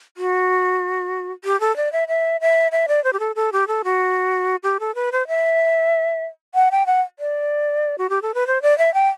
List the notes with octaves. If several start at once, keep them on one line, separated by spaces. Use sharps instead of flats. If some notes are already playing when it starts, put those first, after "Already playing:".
F#4
G4
A4
D5
E5
E5
E5
E5
D5
C5
G4
A4
A4
G4
A4
F#4
G4
A4
B4
C5
E5
F#5
G5
F#5
D5
F#4
G4
A4
B4
C5
D5
E5
G5